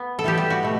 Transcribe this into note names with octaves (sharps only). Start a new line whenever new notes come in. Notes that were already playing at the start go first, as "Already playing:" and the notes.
Already playing: B3
A4
E3 G3 B3 G4
G4
F#4
B2 A3